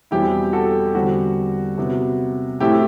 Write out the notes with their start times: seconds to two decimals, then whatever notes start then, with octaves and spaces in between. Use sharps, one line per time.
0.11 E2 B2 G3 C4 E4 G4
0.53 F#4 A4
0.94 E2 D3 G3 C4 F#4
1.78 C3 F#3 B3
2.60 A2 F#3 A3 C4 E4 G4